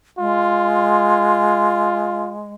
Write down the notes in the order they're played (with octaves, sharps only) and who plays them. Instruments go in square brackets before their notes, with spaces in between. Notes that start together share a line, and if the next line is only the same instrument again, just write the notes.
[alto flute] G#3 [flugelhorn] F4